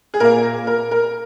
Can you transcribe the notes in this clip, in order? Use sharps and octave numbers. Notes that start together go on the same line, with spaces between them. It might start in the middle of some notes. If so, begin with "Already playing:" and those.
G#4
A#2 A#3 A#4
A#4
A#4